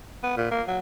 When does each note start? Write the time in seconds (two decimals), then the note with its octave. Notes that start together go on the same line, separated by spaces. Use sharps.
0.23 B3
0.37 A#2
0.51 A#3
0.68 F#3